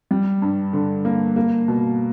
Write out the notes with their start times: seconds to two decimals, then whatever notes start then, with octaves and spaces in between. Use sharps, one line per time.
0.11 G3
0.42 G2
0.73 D3
1.05 A#3
1.36 A#3
1.68 B2